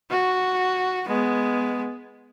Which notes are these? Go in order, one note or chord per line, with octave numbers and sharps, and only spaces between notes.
F#4
G#3 B3